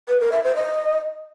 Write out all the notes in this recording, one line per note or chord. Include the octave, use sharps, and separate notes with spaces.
B4
A#4
E5
C5
D#5